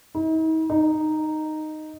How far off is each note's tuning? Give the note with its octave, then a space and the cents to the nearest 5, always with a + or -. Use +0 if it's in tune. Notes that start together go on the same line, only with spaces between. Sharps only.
D#4 +45
D#4 -5